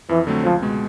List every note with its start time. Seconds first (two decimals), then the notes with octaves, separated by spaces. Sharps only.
0.09 F2 E3
0.27 D3 F#3 A3 C4
0.45 C#2 F3
0.62 B2 G#3